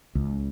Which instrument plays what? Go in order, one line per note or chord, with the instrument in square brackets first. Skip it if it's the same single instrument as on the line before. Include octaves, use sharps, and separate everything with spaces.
[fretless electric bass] C#2